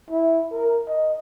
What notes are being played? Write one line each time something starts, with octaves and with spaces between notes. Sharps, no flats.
E4
A#4
D#5